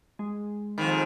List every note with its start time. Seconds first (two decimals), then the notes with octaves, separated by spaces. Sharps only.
0.19 G#3
0.78 F2 G#2 D#3 B5